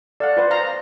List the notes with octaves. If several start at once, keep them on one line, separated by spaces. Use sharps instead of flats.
A4 D5 F5 F#5
F4 B4 C5
C5 F5 A#5